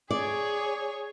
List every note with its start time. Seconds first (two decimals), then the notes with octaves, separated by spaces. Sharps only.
0.11 G#4 C#5 D5